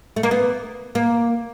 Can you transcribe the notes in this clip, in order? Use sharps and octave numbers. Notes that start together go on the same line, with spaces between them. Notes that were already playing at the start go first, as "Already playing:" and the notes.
A3
A#3
B3
A#3